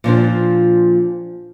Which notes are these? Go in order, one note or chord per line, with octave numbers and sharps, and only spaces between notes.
A#2 F3 D4 C5